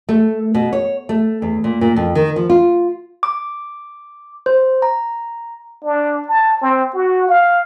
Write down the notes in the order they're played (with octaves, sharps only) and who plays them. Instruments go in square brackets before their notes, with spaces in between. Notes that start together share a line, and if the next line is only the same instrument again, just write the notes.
[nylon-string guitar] A3
B2
C#5
A3
E2
A#2
A#2
F2
D#3
F3
F4
[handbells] D6
C5
A#5
[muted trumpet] D4
A5
C4
F#4
F5